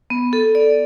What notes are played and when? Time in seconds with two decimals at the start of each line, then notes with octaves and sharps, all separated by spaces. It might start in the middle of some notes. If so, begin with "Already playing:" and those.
0.10 B3
0.33 A4
0.55 D5